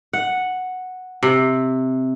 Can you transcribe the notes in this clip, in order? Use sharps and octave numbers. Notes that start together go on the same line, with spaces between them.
F#5
C3